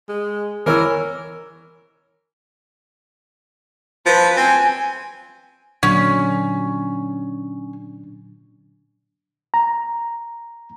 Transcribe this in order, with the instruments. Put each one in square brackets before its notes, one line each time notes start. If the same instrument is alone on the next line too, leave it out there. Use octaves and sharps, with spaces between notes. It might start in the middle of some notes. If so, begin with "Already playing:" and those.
[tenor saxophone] G#3
[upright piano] E3 C#5 E6 [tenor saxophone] A#4
[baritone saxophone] F3 [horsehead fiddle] B4
[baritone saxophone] C4 [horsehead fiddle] G#5
[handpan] A#2 D3 F#3 [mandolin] C#4 [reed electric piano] D4
[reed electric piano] A#5